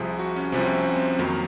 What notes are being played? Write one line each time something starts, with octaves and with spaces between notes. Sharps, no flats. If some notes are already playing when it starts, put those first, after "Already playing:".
Already playing: C2 C3 F3 G#4
F#4
C#4
C2 C3 F3 C4
C#4
C4
C4
F2 D#3 F#3 A#3